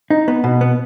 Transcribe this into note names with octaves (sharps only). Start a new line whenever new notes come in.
D#4
B3
B2
B3